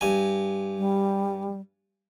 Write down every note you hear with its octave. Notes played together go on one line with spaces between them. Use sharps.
G2 G#5
G3